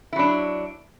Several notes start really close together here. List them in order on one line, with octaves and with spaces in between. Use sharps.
E4 F#3 D4